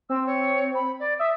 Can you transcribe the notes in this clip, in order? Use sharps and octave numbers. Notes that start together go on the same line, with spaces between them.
C4 E6
C#5
B5
D5
E5 D#6